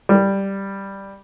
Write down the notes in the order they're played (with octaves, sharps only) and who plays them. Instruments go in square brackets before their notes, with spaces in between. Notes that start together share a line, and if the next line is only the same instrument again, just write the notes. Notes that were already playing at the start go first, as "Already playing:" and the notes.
[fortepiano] G3